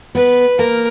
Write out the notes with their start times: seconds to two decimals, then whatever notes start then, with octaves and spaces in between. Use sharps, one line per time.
0.15 B3 B4
0.58 A#3 A#4